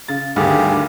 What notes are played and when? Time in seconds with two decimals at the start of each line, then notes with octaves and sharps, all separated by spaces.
0.08 C#3 A6
0.36 G#1 D2 G2 G4 G#4